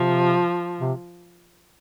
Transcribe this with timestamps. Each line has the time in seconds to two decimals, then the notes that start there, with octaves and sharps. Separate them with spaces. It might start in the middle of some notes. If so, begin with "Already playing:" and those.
Already playing: C3 F3
0.81 C3